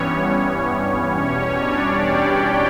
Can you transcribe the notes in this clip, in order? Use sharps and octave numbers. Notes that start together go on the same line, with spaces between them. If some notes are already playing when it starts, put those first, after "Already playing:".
Already playing: G2 E3 G3 B3 C#4 C#5
E2 B2 G3 C#4 C#5
D4 D5
G4 G5